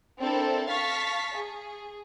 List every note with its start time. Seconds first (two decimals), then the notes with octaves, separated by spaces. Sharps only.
0.20 C4 D4 E4 A4 A#4
0.68 F5 A5 C#6 A6 B6
1.37 G#4